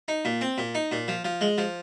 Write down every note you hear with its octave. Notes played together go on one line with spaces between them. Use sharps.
D#4
A#2
C4
A#2
D#4
A#2
F3
F3
G#3
F3